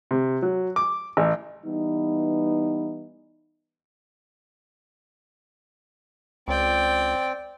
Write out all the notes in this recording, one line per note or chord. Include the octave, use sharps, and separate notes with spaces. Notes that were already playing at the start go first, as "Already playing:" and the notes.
C3
F#3
D6
A1
E3 G3 B3 D#4
C#2 C4 D5 G5